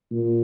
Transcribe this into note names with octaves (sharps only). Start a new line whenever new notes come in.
A#2